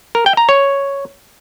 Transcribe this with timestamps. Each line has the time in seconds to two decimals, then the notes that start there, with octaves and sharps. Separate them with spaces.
0.15 A#4
0.26 G5
0.37 A#5
0.49 C#5